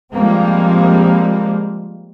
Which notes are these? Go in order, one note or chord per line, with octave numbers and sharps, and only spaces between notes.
F3 G3 G#3 A#3 C4